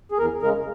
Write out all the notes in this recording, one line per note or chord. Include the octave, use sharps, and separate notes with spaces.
G#4
E2 A#4
C#3 G#3 A#4